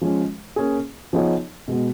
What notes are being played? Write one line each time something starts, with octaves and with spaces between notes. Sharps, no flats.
F3 G#3 C#4
A#3 C#4 G#4
F3 B3 D#4 G#4 C#5
B2 G#3 B3